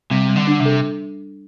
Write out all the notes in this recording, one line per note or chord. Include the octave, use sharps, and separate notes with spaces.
C3 G3
G3
D3
D4
C3
A4